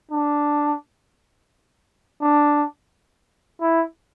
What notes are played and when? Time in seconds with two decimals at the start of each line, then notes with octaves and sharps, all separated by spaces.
0.12 D4
2.22 D4
3.61 E4